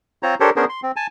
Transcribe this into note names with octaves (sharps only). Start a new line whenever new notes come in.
C4 F4 C5 C#5 A#5
D4 G4 A4 A#4 C5 C#5
B3 C#4 D4 G#4 A#4 C5
C6
C4
G#5 A5